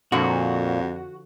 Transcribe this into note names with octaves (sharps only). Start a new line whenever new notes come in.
F2 A#2 D3 F3 E4 F#4